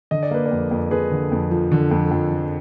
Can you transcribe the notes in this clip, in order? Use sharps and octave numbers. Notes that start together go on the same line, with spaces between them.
D3 D#5
D5
A#3 B4
A#4 D5
F2
F2
F2 G#4 B4
D3
F2
F3
D3
F2
F2
F3